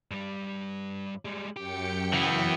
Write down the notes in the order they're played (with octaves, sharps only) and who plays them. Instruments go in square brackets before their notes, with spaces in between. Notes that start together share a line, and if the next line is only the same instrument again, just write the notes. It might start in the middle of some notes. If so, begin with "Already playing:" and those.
[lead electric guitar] G2 G3
G3 G#3
[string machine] F#2 G5 C#7 [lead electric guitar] G4
[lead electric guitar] C#3 [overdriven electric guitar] E3 B3